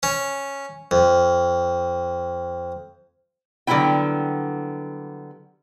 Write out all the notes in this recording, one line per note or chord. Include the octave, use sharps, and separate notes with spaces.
C#4
F2
D3 F#3 G3 B3 E4 G5